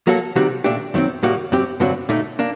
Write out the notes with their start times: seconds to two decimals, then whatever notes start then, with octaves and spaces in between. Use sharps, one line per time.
0.07 F#3 A#3 F#4 A4
0.36 C3 D#3 G3 C4 F#4
0.64 A#2 A3 D4 G4
0.94 F#2 D#3 F#3 C4
1.23 A2 G3 A#3 F#4
1.52 F#2 F#3 C4 G4
1.80 G2 D3 F#3 C4 F#4
2.09 A#2 A3 D#4
2.39 A#3 D4